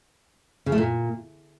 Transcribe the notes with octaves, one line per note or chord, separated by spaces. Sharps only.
C#3
A3
A#2